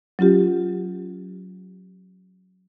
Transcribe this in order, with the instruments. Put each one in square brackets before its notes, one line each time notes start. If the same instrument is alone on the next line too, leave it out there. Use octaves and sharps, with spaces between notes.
[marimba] F#3 C#4 F4 G4